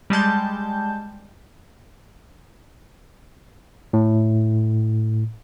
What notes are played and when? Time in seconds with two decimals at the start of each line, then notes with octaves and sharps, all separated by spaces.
0.10 G3 G#3 A5 G6
3.93 A2